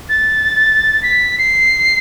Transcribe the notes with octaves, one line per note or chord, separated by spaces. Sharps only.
A6
B6
C7